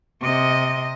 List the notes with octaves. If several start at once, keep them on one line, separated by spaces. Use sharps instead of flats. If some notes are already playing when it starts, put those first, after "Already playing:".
C3 D#5